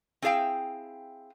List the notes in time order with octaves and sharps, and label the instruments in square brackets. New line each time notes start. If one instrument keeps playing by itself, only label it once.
[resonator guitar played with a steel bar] C4 E4 G#4 D5 F5 G5